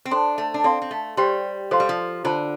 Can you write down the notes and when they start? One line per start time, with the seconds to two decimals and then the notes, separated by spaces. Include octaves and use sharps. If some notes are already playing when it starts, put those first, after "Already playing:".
0.05 C4
0.11 D4 A4 C5 G5 C6
0.38 A3
0.54 D4
0.64 C4 A4 D5 F5 C6
0.82 C4
0.91 A3
1.17 G3 G4 C5 G5 C6
1.71 F3 A4 C5 F5 C6
1.80 G3
1.89 F3
2.24 D3 F4 C5 A5